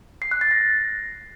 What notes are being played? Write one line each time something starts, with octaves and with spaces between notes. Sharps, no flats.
C7
F#6
A6
A#6